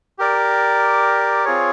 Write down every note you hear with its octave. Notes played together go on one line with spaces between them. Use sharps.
G4 A#4 D5
C4 F4 G#4 C#5